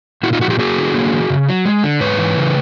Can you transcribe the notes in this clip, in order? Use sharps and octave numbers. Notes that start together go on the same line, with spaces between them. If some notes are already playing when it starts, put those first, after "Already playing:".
A#2 E4 F#4
D#4 F4
F3 E4 F#4
F4 G4
A#3 F#4 G#4
D3
A#3
E3
C#3
F#3
G#3
D3
G#2 B4 C#5
E3
C#3